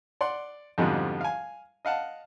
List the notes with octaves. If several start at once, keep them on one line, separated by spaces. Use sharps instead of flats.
D5 F#5 C6
F2 G#2 B2 D3 F3 G3
F5 G#5
D#5 F5 F#5 A5